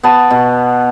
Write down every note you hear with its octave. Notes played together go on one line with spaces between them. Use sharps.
B3 A5
B2